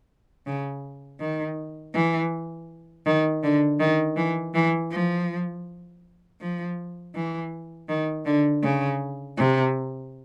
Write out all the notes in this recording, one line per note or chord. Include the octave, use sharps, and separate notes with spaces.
C#3
D#3
E3
D#3
D3
D#3
E3
E3
F3
F3
E3
D#3
D3
C#3
C3